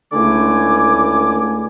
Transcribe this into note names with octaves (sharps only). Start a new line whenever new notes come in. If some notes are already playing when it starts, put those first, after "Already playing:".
C#2 D3 A3 E4 G#5 D6